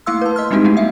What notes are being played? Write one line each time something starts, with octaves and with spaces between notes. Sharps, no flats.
A3 A#3 E4 F5 C6 E6
B4 A5
D#5 C6 F6
G3 G#3 C4 D#4 F#4 G4
A3 B3 E4 G4
E5 F5